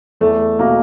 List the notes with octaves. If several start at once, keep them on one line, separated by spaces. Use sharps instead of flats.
E2 A3
B2 A#3